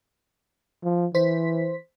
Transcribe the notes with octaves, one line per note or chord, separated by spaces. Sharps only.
F3
E3 C5 B6